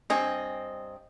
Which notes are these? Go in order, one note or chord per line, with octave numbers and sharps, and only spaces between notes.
G2 C4 D#5 G#5